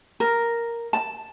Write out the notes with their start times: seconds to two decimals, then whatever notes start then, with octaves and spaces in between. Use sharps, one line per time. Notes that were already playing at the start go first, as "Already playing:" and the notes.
0.20 A#4
0.93 A5